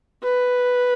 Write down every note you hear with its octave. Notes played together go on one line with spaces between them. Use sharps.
B4